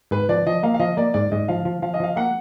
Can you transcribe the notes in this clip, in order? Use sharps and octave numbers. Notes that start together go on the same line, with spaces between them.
G#2 B4
F3 D5
F3 D#5
A#3 F5
F5
F3 D#5
A#3 D5
G#2 D5
G#2 D#5
F3 F5
F3
F3 F5
D#5
F3 F5
A#3 F#5